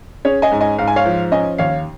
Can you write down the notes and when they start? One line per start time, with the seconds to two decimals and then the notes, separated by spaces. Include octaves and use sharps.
0.25 C#4 G#4 C#5
0.42 D#5 G#5
0.52 G#2
0.61 D#5 G#5
0.78 G#2 F5
0.87 G#5
0.96 C#5 F5
1.06 F3
1.32 C#4 D#5 G#5
1.58 D#2 C#5 F5